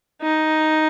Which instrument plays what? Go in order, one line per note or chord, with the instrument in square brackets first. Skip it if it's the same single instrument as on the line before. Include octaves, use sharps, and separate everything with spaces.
[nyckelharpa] D#4